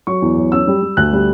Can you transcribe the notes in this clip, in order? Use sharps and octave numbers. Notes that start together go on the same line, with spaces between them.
F#3 C#6
E2
F#3
C#4 E6
G3
G3
D2 F#6
G3